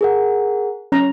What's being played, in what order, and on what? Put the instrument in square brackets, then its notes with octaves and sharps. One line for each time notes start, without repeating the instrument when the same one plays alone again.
[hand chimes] G#4 A#4 F#5
[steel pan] C#4 A#5